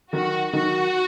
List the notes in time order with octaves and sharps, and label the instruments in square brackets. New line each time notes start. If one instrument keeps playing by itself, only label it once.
[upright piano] D#3 F#3 D#4 [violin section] F#4
[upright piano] D#3 F#3 D#4 [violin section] F#4